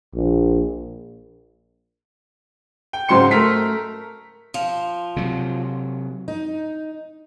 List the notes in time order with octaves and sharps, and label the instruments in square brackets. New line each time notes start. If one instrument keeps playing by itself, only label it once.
[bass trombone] A#1
[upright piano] G5
G#2 C#3 F#3 C5 C6 C#7
A3 A#4 A#5 B6
[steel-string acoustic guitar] F3
[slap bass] C3 F#3
[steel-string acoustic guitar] D#4